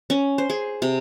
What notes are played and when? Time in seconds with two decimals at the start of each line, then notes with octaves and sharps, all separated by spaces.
0.10 C#4
0.38 C5
0.50 G#4
0.82 C3